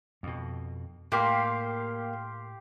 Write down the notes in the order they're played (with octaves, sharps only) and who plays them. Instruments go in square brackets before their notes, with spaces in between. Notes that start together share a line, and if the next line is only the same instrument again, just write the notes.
[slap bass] F2 B2
[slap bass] A2 [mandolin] A#3 [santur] G4 F5 C6